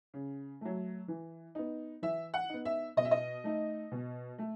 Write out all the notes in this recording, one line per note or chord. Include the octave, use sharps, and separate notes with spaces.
C#3
F#3 A3
E3
B3 D#4
E3 E5
F#5
B3 D#4
E5
B2 D#5
E5
D#5
A3 D#4
B2
A3